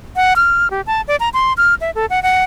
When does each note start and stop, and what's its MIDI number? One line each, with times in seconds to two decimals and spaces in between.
0.16 0.34 78
0.36 0.68 89
0.71 0.81 67
0.87 1.01 81
1.08 1.16 74
1.20 1.29 82
1.34 1.53 84
1.57 1.74 89
1.81 1.91 76
1.95 2.06 69
2.10 2.22 78
2.23 2.44 78